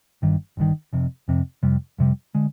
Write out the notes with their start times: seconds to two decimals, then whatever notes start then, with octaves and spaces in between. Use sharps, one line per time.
0.22 G1 G2 D#3
0.57 G1 G2 D#3
0.93 F1 F2 C3
1.28 F1 F2 C3
1.63 F2 C3 G3
1.98 F2 C3 G3
2.35 D3 G#3